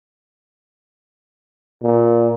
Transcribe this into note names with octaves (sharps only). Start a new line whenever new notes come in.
A#2